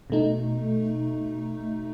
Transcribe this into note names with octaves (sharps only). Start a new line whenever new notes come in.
B2 A3 D#4